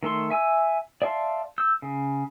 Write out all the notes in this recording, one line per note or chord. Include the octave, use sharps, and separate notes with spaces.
D#3 A3 A4 C6
E5 G#5 E6
D5 E5 F5 A5 C6
E6 G6
C#3